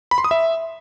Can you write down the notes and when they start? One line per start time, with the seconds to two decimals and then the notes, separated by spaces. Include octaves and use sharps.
0.11 B5
0.18 C6
0.24 D#6
0.31 E5